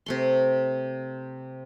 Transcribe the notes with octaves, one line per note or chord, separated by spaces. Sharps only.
C3 A3 C6